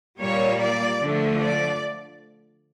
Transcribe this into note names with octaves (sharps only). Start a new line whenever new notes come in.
A#2 G3 A#3 C#5
D5
D3 F3 A3
D5